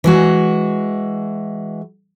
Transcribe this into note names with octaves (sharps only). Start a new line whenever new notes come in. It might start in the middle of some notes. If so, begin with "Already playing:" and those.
E3 G#3 F#4